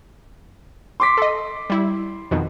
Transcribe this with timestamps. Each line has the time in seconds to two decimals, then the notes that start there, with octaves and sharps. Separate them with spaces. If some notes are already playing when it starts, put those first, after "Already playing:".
1.00 C6 D6 B6
1.17 A4 D#5
1.70 G3 E4
2.31 F2 B2 D#3